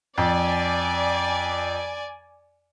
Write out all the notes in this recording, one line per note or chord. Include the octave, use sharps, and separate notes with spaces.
F2 D5 G#5